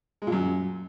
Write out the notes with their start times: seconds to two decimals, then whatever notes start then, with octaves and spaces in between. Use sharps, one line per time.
0.22 G#3
0.27 A#2
0.32 F#2